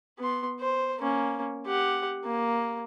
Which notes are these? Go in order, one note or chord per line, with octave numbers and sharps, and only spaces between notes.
B3 C6
C5
A#3 C#4
G4 F#5
A#3